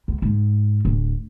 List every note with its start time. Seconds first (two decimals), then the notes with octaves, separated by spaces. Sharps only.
0.08 C#2
0.22 G#2
0.85 D1